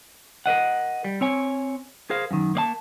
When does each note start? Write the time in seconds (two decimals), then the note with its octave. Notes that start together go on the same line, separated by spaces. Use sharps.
0.46 A#4 B4 D#5 F#5
1.04 G3
1.21 C4 C#5 G#5
2.10 G#4 A#4 C5 F5
2.31 F#2 D#3
2.55 A#3 D5 A5